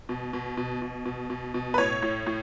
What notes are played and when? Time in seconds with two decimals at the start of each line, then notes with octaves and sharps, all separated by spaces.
0.09 B2
0.33 B2
0.57 B2
0.82 B2
1.05 B2
1.30 B2
1.54 B2
1.74 B4
1.78 A2 C#5
2.02 A2
2.26 A2